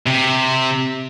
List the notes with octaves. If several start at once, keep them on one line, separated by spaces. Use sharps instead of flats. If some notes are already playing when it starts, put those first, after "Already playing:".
C3